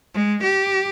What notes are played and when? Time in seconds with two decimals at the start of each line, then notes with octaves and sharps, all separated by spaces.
0.14 G#3
0.43 G4